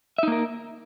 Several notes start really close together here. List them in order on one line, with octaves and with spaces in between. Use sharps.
E5 D#4 A#3 A#4